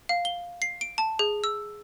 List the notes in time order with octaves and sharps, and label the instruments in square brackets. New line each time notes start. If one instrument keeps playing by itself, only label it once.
[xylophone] F5
G7
C7
D7
A5
G#4
E6